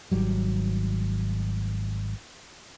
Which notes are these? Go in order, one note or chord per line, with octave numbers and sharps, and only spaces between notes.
G#1 F#3 G3